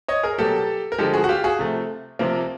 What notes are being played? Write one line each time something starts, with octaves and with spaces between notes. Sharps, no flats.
C#5 D#5
G#4 A#4
B2 F#3 A#3 G4 A4
A#4
D3 F3 G#3 G4 A4
F#4 G#4
F#4
F4 G4
F#4 G#4
C3 F3 A3
C3 F3 A#3